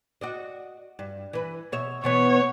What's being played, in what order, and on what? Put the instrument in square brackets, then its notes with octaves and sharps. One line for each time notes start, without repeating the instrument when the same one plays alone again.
[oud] F#4 D5 D#5
G2
E3 B4
B2 C#5 E5
[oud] B2 E3 B3 [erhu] C#5